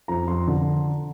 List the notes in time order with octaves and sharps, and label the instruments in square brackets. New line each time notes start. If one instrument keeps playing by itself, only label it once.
[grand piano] F2 A#5
F2 C6
D3